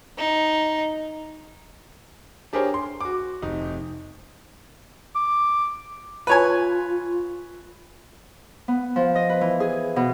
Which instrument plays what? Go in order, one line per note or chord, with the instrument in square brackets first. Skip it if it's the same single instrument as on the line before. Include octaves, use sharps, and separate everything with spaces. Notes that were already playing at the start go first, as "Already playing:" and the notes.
[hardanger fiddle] D#4
[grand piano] D4 G4 G#4 A#4 C5 C#5
C6
F#4 D6
F1 D#4
[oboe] D6
[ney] F4 [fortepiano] B4 C#5 G#5
[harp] B3
F3
D#5
B4
E3
G#4
B2